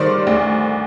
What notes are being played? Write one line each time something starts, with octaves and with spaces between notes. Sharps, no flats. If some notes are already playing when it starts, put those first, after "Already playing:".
Already playing: G2 D#3 C5 D5
D2